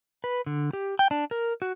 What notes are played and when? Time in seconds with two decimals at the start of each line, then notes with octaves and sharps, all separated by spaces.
0.24 B4
0.46 D3
0.73 G4
0.99 G5
1.11 D4
1.31 A#4
1.62 F#4